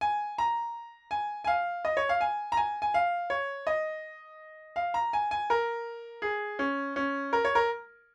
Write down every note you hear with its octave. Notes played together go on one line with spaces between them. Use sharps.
G#5
A#5
G#5
G#5
F5
D#5
C#5
F5
G#5
A#5
G#5
G#5
F5
C#5
D#5
F5
A#5
G#5
G#5
A#4
G#4
C#4
C#4
A#4
C#5
A#4